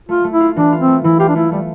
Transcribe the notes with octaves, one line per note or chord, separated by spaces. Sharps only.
A3 F4
A3
E4
F4
E3 D4
F4
C4
A3
E3 E4
F4 G4
D4
A3 E4
G3 A3